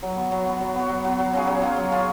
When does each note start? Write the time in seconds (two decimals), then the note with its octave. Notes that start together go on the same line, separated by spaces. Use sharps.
0.03 F#3
0.16 B3 F#4
0.32 F#3
0.46 B3 F#4
0.60 F#3
0.75 B3 F#4
0.89 F#3
1.05 B3 F#4
1.19 F#3
1.33 C#4 F4 G#4
1.47 F#3
1.62 C#4 F4 G#4
1.76 F#3
1.91 C#4 F4 G#4